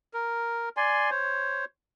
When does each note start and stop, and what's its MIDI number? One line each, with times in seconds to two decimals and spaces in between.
0.14 0.69 70
0.77 1.10 74
0.77 1.10 80
0.77 1.10 84
1.11 1.65 72
1.11 1.65 73